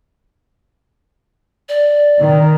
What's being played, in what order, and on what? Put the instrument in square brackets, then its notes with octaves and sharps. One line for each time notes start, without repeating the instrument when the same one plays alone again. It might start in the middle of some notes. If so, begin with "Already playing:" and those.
[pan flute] D5
[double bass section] D#3